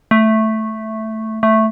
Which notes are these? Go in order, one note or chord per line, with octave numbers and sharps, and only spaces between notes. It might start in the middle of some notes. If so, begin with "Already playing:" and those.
A3
A3